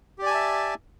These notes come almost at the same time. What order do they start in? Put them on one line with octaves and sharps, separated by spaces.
G4 D5 G#5 A5 E5